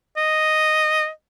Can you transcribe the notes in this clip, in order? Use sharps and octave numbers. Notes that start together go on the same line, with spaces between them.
D#5